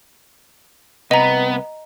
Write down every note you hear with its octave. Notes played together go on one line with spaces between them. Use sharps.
C2 C3 B3 B4 D#5 A#5